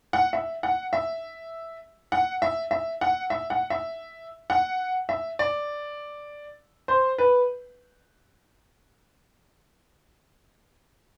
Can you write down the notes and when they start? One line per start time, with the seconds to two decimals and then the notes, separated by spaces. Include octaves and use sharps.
0.13 F#5
0.33 E5
0.63 F#5
0.93 E5
2.12 F#5
2.42 E5
2.71 E5
3.01 F#5
3.30 E5
3.50 F#5
3.70 E5
4.50 F#5
5.09 E5
5.39 D5
6.88 C5
7.18 B4